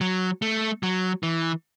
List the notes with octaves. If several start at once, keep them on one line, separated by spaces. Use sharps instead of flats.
F#3
A3
F#3
E3